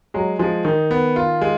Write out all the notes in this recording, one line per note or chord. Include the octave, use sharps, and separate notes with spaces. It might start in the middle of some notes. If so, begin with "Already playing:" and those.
F#3 G#3
F3 G#3
D#3 D#4
B3
F4
G#3